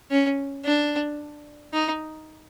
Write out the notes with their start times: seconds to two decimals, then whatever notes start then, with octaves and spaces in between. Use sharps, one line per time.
0.11 C#4
0.65 D4
1.73 D#4